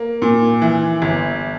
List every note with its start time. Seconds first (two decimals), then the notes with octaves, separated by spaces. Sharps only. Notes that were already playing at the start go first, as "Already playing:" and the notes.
Already playing: A#3
0.22 A#2
0.62 E3
1.02 G1